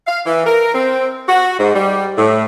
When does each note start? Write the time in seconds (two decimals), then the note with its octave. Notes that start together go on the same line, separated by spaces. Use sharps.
0.07 F5
0.26 E3
0.46 A#4
0.74 C4
1.29 F#4
1.58 G#2
1.74 G3
2.18 A2